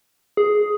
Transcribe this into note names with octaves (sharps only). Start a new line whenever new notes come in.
G#4